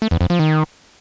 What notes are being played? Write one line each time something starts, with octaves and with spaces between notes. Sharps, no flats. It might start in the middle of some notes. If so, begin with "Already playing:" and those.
A3
E2
F2
F3
D#3